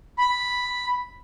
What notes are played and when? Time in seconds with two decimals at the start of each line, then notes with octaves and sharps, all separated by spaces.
0.18 B5